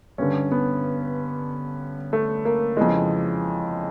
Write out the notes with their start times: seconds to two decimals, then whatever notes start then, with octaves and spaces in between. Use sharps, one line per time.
0.18 G2 D3 C#4
0.51 B3
2.13 A3
2.45 A#3
2.77 F2 C#3 E3 G#3